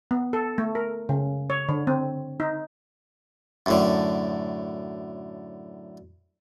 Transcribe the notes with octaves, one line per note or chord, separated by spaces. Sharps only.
B3
A4
A3
A#4
C#3
C#5
D3
C4
D#4
F#2 A2 D3